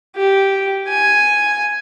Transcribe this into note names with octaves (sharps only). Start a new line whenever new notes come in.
G4
G#5